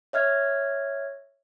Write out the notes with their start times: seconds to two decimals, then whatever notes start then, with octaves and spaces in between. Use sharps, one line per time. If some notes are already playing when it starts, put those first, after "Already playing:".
0.13 C#5 E5 F6 G#6